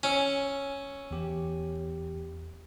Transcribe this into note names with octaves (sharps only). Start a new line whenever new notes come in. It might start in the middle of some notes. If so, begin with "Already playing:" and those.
C#4 C#6 E6
E2 G4